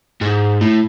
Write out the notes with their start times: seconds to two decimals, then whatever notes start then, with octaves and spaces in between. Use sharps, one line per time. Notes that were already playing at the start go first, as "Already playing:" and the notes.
0.21 G#2
0.61 A2